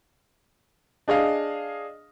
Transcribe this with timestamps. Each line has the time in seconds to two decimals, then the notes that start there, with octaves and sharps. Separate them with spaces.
1.08 D4 G#4 D#5 F5